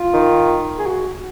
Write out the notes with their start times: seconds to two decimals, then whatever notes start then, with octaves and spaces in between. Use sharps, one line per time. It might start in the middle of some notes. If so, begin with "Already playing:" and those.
Already playing: F4
0.13 D#3
0.78 G#4
0.86 F#4